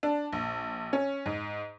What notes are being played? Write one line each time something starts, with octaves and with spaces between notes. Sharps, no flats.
D4
A#1
C#4
G#2